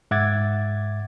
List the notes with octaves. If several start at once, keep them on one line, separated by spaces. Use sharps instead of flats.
G#2 E5 F#5 D6 G#6 A6